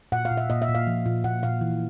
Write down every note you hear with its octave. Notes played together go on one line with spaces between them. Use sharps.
A#2 F#5
F5
A#2
E5
A#2 D#5
E5
A#2
F5
F3
A#2
A#2 F#5
A#2 F5
E3